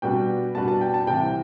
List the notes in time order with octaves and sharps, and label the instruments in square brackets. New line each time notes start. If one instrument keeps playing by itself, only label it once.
[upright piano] B2 G3 D4 F#4 B4 [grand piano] G5
[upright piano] B2 G3 D4 F#4 B4 [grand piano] A5
[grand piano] A5
G5
A5
[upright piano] C2 C3 E3 [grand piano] G5